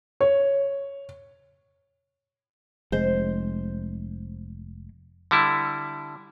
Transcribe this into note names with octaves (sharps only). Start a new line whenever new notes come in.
C#5
F1 G#3 C5
D3 G3 E4